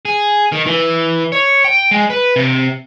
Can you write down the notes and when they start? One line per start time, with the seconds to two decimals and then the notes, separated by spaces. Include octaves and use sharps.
0.05 G#4
0.52 D#3
0.66 E3
1.32 C#5
1.65 G5
1.91 G#3
2.10 B4
2.36 C3